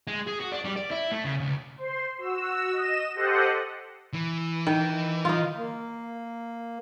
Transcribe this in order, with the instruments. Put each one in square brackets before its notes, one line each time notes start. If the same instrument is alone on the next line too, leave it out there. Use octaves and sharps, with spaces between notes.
[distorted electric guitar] G#3
G#4
F#4
D4
G3
D5
E4
A3
C#3
C#2
[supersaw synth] C5 C6
F#4 E6
D#5 E7
G4 A4 C5 D#5 F#5
[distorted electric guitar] E3
[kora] D#3
D#4 F4
[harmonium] A#3